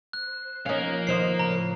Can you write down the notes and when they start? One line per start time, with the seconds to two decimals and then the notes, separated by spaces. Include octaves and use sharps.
0.13 C5 F#6
0.66 F3 C#4 D#4 A#4 F5 B5 G6
1.07 D#2 C5 D#5 C7
1.39 A2 C#3 F3 A#5